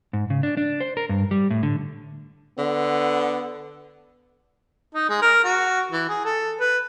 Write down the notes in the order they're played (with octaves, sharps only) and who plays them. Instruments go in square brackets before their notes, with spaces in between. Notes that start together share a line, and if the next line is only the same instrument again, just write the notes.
[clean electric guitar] G#2
C#3
D4
D4
C5
A#4
G2
G3
A2
D3
[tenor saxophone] D3 [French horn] B3
[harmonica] D#4
G#3
A#4
F#4
E3
G#4
A4
B4